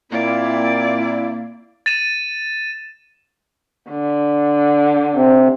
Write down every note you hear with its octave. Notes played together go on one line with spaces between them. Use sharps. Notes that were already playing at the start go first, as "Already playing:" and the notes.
A#2 A#3 C4 E4 D5
A6 D#7 E7
D3
C3